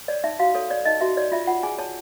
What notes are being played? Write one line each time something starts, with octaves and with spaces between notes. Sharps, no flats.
C#5 D5
D#4 E5
F#4 F5
A4 C#5
C#5 D5
D#4 D#5
F#4 E5
C#5 D5
F4 E5
F4 F#5
G#4 G#5
C#5 A5